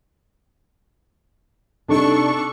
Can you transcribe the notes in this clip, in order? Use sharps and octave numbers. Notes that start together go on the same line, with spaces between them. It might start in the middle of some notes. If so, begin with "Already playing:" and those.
C3 D4 D#4 A4 C#6